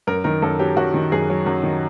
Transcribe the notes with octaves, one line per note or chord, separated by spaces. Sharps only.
F#2 A#4
D#3 A#4
F#2 A4
F#3 G4
F#2 F#4
D#3
F#2 G#4
F#3
F#2
D#3